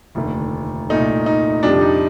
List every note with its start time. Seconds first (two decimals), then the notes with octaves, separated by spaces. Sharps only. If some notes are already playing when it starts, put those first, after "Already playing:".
0.15 F1 D#2 D3 A3
0.90 C2 A#2 A3 D#4
1.26 D#4
1.63 F2 C3 G3 D4
1.81 D#4